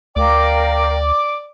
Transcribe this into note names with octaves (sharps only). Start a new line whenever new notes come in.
D2 A#4 D5 F5 G5 D6